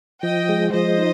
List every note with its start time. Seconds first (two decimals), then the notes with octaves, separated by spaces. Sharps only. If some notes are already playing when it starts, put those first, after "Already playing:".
0.23 F3 D#5 G5
0.49 G#3
0.73 F3 C5 D#5
0.98 D#4